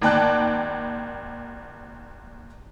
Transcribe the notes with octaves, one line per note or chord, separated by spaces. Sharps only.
G#1 D#2 D5 G5 A5 F#6